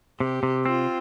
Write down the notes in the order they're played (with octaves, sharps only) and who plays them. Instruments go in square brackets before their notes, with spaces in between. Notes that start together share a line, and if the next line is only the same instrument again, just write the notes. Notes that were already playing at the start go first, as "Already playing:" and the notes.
[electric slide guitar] C3 [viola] G4
[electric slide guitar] C3
[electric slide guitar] C4 [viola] F4